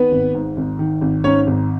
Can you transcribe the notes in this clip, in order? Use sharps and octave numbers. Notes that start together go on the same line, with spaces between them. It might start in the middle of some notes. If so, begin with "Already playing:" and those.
Already playing: D#3 B3 B4
G#1
G#2
G#1
D#3
G#1
G#2 C#4 C#5
G#1